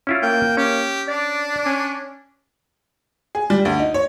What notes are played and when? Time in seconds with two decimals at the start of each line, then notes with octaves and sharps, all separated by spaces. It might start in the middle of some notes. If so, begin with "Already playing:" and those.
0.07 C#4 E4 F4
0.23 A#3 G5
0.57 C#4 G4
1.08 D4 D5
1.65 C#4
3.35 G#4
3.50 G3
3.65 D2
3.79 D#4
3.94 C#5